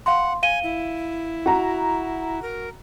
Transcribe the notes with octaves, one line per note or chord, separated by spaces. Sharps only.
F5 F#5 C6
F5 G#5 D#7 G7
E4
F#4 A#5
A#4